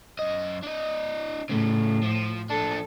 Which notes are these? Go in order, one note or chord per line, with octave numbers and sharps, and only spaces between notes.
F#2 D#5
D4 D#5
A2 C#3 A3
F3
F3 D4 A4